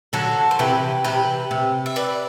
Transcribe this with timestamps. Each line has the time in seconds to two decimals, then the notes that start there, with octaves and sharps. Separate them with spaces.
0.13 D3 F#3 F#4 A4
0.51 C5
0.59 C3 E3 G4 B4
1.04 C3 E3 G4 B4
1.51 C3
1.86 E5
1.96 B4 D5